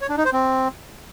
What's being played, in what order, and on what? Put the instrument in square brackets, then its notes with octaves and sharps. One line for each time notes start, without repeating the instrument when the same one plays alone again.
[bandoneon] C#5
D4
D#4
C5
C4